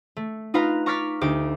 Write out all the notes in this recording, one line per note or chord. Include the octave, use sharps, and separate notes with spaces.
A3
D#4 F4 B4 F5 A#5
A#5 C#6 D6 F6 A6 B6
D2 D#4 G4 D6